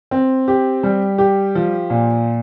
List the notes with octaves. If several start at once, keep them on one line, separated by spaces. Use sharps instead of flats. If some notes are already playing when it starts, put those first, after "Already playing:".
C4
G4
G3
G4
F3
A#2